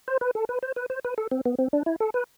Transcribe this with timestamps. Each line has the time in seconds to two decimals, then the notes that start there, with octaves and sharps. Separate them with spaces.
0.08 C5
0.21 B4
0.35 A4
0.49 B4
0.63 C5
0.76 B4
0.90 C5
1.05 B4
1.18 A4
1.31 C4
1.45 B3
1.58 C4
1.73 D4
1.86 E4
2.00 A4
2.14 B4